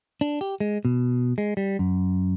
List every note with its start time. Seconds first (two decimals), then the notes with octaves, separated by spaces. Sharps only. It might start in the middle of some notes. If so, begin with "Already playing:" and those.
0.21 D4
0.41 G4
0.60 G#3
0.85 B2
1.38 G#3
1.57 G3
1.79 F#2